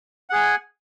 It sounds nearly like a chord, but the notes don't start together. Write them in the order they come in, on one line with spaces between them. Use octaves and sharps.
F#5 G#4 G#5